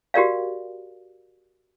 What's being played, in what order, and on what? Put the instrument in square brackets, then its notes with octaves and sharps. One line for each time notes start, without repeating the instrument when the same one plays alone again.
[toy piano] F#4 G4 A#4 D5 F5